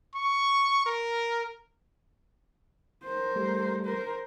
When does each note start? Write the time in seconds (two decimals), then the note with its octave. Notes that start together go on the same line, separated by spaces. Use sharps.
0.15 C#6
0.86 A#4
3.04 A#4 C5
3.36 G3 A3
3.85 A#4 C5